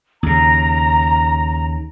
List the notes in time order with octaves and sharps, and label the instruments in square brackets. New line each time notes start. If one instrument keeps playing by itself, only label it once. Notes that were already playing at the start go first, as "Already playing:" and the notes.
[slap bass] D#2 C#3 [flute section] A#5